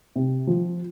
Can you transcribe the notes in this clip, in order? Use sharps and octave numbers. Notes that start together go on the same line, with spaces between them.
C3
F3